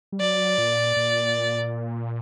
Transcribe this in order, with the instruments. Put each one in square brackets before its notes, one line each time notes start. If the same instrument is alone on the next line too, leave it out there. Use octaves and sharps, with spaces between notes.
[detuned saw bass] G3
[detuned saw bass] F#3 [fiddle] D5
[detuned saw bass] A#2
A#2